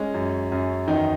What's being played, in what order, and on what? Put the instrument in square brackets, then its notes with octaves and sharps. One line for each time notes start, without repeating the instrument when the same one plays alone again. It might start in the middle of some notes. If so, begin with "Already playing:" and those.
Already playing: [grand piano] G#3 C#4
F#2
F#2
E2 D#3 D#4